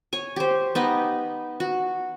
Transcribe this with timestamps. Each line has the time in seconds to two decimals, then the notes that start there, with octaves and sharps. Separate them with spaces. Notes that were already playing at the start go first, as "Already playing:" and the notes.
0.13 C#5 G#5
0.36 G4 C5
0.75 B3 D#4 G4 D#5
1.60 F#4